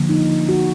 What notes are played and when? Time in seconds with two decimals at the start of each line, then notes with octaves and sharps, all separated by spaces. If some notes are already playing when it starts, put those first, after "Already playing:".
Already playing: D3 F3 A#3
0.09 D#4
0.49 F#4